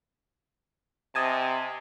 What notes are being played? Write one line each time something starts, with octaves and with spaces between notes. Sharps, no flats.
C3 D#5 G#5 A5